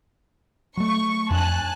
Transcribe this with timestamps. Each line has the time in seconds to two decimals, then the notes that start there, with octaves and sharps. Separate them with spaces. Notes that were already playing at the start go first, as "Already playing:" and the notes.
0.77 F#3 A3 C#6
1.30 F2 D4 G#5 A5 F#6